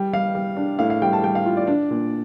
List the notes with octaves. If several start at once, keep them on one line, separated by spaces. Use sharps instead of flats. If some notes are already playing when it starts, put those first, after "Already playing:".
Already playing: G3 G5
G3 F5
G3
D4
A2 F5
F5
G3 G5
A5
G3 G5
F5
F4
D5
D4
A#2